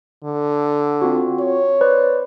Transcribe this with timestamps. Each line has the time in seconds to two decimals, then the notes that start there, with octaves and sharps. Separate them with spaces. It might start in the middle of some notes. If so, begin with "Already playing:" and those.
0.24 D3
1.02 C4 F4 F#4
1.40 C#5
1.81 B4 C5 D5